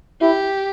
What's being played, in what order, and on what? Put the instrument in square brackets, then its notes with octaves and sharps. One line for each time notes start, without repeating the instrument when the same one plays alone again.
[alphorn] E4 [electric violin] G4